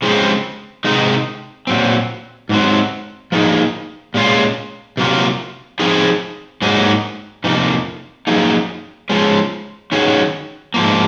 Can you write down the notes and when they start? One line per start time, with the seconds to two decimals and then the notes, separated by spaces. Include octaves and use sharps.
0.02 C#3 F3 G#3 C4
0.84 C3 D#3 G#3 D#4
1.67 A#2 F#3 C4
2.49 G#2 F#3 C4
3.32 F3 A#3 D#4 G#4
4.14 A#2 G#3 C#4 F4
4.97 C3 F#3 A#3 F4
5.79 F3 C4 D#4 G#4
6.62 G#2 F#3 A#3 D#4 G#4
7.44 F2 C3 F3 A#3 D#4
8.27 F#2 F3 A#3 D#4 G#4
9.10 F3 G#3 C#4
9.92 D#3 F#3 C#4 G#4
10.74 G#2 F3 A#3